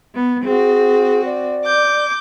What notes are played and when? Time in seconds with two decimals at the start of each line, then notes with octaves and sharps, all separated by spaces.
0.14 B3
0.44 C4 F#4 G#4
1.25 D5
1.65 D6 G6